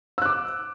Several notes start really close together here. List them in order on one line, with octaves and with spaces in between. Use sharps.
E6 F#6 D6